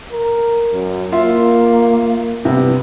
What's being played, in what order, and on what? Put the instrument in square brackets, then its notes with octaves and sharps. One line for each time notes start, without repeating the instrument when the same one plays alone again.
[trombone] A#4
F#2
[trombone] A#3 [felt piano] F4 E5
[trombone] G2 [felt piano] C3 B3